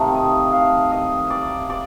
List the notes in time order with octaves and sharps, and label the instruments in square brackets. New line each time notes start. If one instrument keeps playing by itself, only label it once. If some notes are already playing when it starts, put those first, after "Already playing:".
Already playing: [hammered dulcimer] C3 D#3 A3 D#4 F5
D#5
F5
D#5
D5
D5